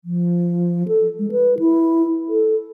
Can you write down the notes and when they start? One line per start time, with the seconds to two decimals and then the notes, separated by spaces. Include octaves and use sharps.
0.05 F3
0.88 A4
1.19 G#3
1.32 B4
1.59 E4
2.29 A4